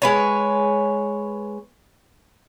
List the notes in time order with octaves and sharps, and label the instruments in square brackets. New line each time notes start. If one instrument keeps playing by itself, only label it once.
[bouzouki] G#3 B4 C#5